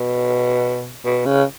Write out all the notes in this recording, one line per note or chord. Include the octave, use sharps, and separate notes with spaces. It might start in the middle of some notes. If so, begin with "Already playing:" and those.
Already playing: B2
B2
C#3